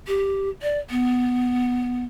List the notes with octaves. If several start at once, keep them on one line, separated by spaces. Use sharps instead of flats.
G4
D5
B3